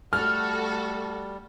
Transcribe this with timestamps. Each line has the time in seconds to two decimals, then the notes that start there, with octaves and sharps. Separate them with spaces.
0.13 G3 A3 F#4 A4 F6